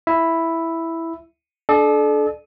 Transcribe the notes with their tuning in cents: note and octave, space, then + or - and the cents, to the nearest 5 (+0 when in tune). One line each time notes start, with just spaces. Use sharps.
E4 +0 E5 +0
D4 +0 A4 -35 D5 +30